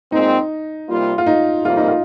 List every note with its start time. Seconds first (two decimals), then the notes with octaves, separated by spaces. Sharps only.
0.12 A#2 G#3 C4 D#4
0.89 C3 G3 A#3 F4
1.18 F4
1.26 D#4
1.64 F2 C3 G3 A#3 F4
1.76 D#4
1.88 F4